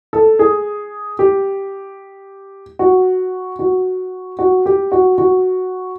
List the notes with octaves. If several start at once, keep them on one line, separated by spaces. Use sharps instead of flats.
A4
G#4
G4
F#4
F#4
F#4
G4
F#4
F#4